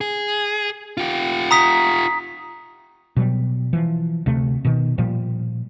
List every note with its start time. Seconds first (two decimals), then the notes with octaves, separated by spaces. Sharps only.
0.01 G#4
0.97 F4 G4
1.51 A#5 D#6 B6
3.16 B2 F#3 G3
3.73 E3 F3
4.26 D2 C3 A3
4.65 B2 D#3
4.98 A#2 F3 G3